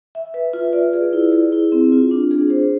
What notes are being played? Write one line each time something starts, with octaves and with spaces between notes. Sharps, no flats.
E5
B4
F4
D5
G#4
E4
G#4
E4
C4
F4
D4
G#4
C5